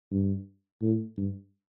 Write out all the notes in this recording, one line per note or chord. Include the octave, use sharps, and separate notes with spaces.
G2
A2
G2